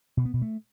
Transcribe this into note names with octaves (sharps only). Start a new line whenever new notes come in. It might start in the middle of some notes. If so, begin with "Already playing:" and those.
B2
B3
B2
A3